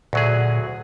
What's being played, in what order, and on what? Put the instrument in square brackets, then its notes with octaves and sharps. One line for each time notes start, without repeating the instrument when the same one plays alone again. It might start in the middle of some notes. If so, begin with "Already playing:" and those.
[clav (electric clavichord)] D2 F#3 G#4 [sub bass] A#2